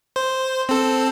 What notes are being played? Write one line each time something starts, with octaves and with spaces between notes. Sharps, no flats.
C5
C4 A4